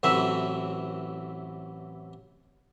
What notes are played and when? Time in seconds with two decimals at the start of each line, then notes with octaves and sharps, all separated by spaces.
0.03 A1 C3 E3 F#3 E5